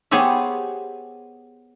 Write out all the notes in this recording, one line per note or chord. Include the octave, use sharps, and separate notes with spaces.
B3 G4 G#4 C5 C#5 E5